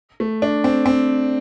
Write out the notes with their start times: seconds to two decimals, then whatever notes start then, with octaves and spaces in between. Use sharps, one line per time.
0.20 A3
0.42 D4
0.64 C4
0.86 C4